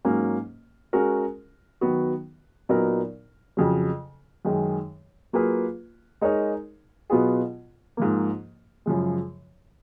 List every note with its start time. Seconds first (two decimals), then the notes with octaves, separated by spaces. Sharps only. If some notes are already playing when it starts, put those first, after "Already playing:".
0.05 G#2 F#3 A#3 C#4
0.93 G#3 C#4 F#4 A#4
1.81 D#3 F#3 B3 F#4
2.69 A#2 F#3 B3 D#4 A#4
3.57 F2 C#3 F#3
4.45 F#2 D#3 G#3
5.33 F#3 A#3 F4 G#4 B4
6.21 G#3 D#4 A#4 C#5
7.10 B2 F#3 B3 F4 G#4
7.97 G#2 F3 A#3
8.86 F#2 C#3 F3 G#3